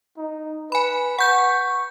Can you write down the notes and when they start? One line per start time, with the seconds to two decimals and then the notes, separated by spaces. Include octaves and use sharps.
0.18 D#4
0.72 B4 G#5 B5
1.19 F#5 C#6 G6